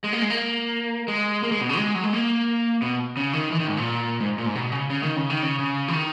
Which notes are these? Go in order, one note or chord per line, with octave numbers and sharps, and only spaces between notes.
G#3
A#3
G#3
A#3
G#3
A#3
G#3
B2
C#3
G#3
F#3
G#3
A#3
B2
C#3
D#3
E3
D#3
G#2
A#2
G#2
A#2
G#2
B2
C#3
C#3
D#3
C#3
D#3
C#3
C#3
E3
D#3